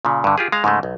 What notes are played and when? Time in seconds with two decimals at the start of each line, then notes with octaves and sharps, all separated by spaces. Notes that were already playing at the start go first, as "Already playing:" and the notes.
0.05 A#2 C#3
0.24 G2 D3
0.38 F4 G4 G#4
0.52 G#3 F5 A#5
0.64 G#2 C#3 G#3 A3
0.83 B1